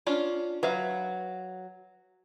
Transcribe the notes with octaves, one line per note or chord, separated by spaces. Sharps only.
C#4 D4 F4
F#3 B4 E5 F5